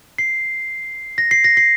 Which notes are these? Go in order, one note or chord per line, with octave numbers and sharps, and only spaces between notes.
C7
A#6
C7
A#6
C7